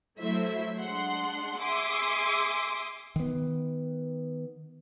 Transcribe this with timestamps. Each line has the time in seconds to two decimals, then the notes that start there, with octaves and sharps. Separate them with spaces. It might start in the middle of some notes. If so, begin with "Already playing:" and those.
0.20 F#3 A3 E4 C5 E5
0.79 G#3 D4 F#5 C6
1.60 G#4 E5 G#5 C6 D6 D#6
3.16 D#3 B3